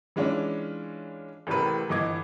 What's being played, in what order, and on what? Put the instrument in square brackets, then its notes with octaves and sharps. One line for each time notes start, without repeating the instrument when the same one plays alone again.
[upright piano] E3 G#3 C#4 D4 F4
A1 A2 C3 G3 A#4 B4
G1 E3 D#5 D6 G#6